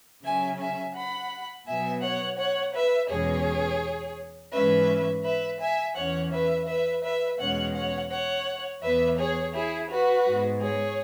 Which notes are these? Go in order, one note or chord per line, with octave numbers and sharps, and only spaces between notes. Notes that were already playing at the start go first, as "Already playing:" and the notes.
C#3 F#3 C#4 E5 G#5
E5 G#5
F#5 B5
B2 F#3 B3 E5 G#5
C#5 F#5
C#5 F#5
B4 E5
E2 B2 G#3 C#4 G#4 C#5
G#2 E3 G#3 C#4 B4 E5
B4 E5
E5 G#5
E2 E3 C#4 C#5 F#5
B4 E5
B4 E5
B4 E5
E2 B2 G#3 C#4 C#5 F#5
C#5 F#5
C#5 F#5
E2 E3 B3 B4 E5
G#4 C#5
E4 G#4
F#4 B4
G#2 G#3 B3
G#4 C#5